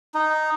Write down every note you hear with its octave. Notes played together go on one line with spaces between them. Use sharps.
D#4